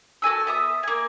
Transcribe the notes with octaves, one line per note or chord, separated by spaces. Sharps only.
F#4 A4 G#5 E6
B3 E5 D#6
A#3 G#5